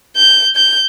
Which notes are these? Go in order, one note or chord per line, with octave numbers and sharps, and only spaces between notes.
G6
G6